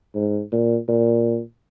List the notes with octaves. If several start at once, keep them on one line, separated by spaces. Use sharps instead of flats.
G#2
A#2
A#2